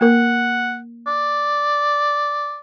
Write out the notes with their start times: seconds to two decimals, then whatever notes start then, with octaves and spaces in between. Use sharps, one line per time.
0.01 A#3 A#4 F#5
1.07 D5